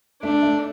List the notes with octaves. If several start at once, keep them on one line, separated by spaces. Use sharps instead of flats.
A3 D4
A3